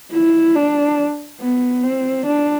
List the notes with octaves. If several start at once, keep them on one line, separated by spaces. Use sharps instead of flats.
E4
D4
B3
C4
D4